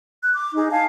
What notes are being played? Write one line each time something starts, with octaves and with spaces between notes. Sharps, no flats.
F#6
D6
D#4 G#4
F5 G#5 A5